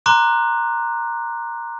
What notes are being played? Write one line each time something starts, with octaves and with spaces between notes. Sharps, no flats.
A#5 C6 D6 F#6